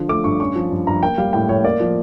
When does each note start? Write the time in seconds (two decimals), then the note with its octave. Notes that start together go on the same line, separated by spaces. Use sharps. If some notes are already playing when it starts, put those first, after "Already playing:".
Already playing: D3 F3
0.09 A3 D6
0.24 G2 C#6
0.40 C#4 C#6
0.55 F3
0.71 G2
0.87 G2 A#5
1.02 A#3 G5
1.18 G3 F5
1.33 A2 G5
1.49 A2 C#5
1.64 A#3 D5
1.80 F3